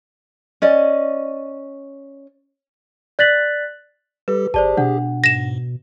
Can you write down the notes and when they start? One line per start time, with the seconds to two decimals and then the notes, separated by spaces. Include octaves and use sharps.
0.62 C#4 D5 D#5
3.19 D5 F#6 A6 B6 F#7
4.28 G3 G4 A4 B4
4.54 G#1 G4 G#4 C5 D5 A5
4.77 B2 D4 F#5
5.24 G#2 A#6 E7